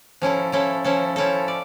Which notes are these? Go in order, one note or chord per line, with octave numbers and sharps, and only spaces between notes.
F3 C#4 E4 A4
F3 C#4 E4 A4
F3 C#4 E4 A4
F3 C#4 E4 A4
D5